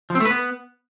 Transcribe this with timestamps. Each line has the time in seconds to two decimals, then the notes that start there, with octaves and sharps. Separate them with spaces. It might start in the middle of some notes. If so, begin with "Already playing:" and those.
0.10 F3
0.15 C4
0.20 A3
0.25 B4
0.30 B3